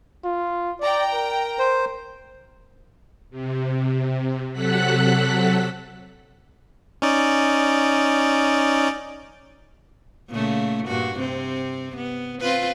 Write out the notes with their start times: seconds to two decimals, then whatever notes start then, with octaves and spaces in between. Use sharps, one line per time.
0.25 F4
0.81 D5 G5 A#5
1.14 A#4
1.59 C5
3.31 C3
4.53 C3 F#3 A4 F#5 F#6 B6
7.02 C#4 D#4 D5
10.30 A#2 C#3 A3
10.87 G2 A#2 F#4
11.18 C3 C4
11.97 B3
12.40 C4 F4 B4